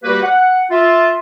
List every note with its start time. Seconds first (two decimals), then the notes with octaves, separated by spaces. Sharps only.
0.04 G3 A#3 F#4 G4 B4
0.23 F#5
0.71 F4 E5